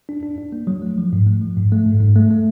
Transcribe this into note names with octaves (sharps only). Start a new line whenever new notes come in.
D4
D4
D4
A#3
F#3
A3
F3
G#2
A3
F3
G#2
A3
G#2
G#2
A3
A3